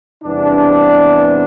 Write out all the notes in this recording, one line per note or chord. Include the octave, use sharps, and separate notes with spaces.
E2 C3 G3 B3 D4